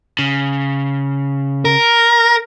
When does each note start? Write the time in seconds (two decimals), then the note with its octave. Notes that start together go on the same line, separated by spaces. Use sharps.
0.19 C#3
1.65 A#4